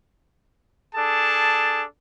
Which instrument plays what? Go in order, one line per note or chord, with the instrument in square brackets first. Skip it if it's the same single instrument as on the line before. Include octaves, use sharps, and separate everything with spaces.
[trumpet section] D4 G#4 A4 A5